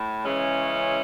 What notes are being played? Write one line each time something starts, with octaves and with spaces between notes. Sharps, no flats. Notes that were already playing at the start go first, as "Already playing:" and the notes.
Already playing: A2
C#3 E3 G#3 C#4 E4